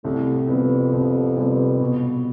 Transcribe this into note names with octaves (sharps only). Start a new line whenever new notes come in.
C2 A2
F2 C3 G3 B3
C2
C3 G3 B3
B2